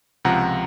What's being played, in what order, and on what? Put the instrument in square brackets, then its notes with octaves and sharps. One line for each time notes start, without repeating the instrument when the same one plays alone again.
[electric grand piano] C#2 C3 F3 F#5 A#5